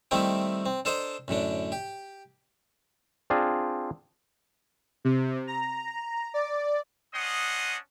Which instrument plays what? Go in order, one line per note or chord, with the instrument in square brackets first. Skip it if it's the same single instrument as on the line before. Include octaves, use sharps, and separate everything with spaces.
[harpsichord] D#3 G3 A3 C4 D#4 E4
C4
D4 A4 C5 D#5 A5 A#5
F#2 A2 D3 D4
G4
[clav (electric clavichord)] C4 D4 F4 G#4
[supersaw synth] C3
A#5
D5
[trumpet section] C#4 D4 D#5 F#5 C6 D#6